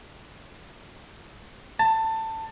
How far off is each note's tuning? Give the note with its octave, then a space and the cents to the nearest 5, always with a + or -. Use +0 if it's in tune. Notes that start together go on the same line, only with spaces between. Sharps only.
A5 +20